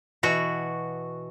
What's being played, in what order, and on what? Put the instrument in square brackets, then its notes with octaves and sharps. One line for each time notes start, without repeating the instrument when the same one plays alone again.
[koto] B2 E3 F#4